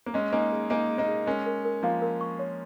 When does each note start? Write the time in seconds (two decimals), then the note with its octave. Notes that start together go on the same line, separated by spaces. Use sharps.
0.06 A#3
0.14 G#3 C#4 D#5
0.33 A#3 D#4 G#5
0.52 G#4
0.70 A#3 D#4 G#5
0.90 G#4
0.98 A#3 D#4
1.08 G#4
1.27 G#3 C#4 A#4
1.46 A#4
1.65 A#4
1.83 F3 A#3 F5
2.02 A#4
2.21 C#6
2.39 C#5